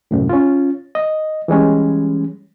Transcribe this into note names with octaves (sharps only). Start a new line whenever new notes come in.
C2 F#2 A2
C#4 F4
D#5
E3 G3 G#3 C#4